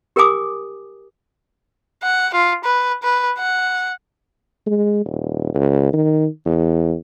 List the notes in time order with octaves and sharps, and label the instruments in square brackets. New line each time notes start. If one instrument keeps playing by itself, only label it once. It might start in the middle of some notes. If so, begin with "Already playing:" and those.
[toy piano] G4 A#4 G5 G#5 D6 D#6
[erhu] F#5
F4
B4
B4
F#5
[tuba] G#3
D#1
C#2
D#3
E2